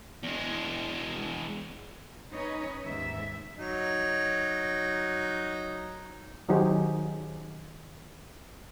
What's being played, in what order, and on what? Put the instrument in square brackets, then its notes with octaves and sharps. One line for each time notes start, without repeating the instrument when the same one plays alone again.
[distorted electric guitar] E2 G#3
[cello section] C#4 D#4 B4 C#5 D#5
D#2 G#2 E5
[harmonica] F#3 D#4
[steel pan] D#3 F#3 D#4 G4 G#4 C5